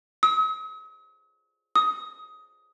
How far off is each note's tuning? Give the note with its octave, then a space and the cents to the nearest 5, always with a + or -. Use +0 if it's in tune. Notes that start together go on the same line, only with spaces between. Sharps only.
D#6 +45
D#6 +15